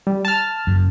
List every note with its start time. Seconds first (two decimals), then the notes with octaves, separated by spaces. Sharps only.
0.07 G3
0.25 A5 F6
0.67 F#1 F#2